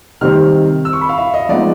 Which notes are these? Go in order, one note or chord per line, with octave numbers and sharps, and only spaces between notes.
C3 D#3 G3 C4 F6
E6
C#6
B5
F5
E5
D#5
F3 G#3 B3 D#4 D5